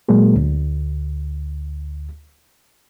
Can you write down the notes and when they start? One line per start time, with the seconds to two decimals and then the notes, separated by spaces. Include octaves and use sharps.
0.09 A#2 F#3 G#3 A#3
0.35 D2